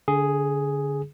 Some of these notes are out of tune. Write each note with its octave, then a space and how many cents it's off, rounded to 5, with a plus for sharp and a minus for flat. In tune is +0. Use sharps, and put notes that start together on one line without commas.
D3 -25 G#4 +0